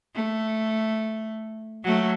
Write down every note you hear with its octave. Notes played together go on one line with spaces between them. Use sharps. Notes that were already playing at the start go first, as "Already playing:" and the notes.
A3
F#3 A3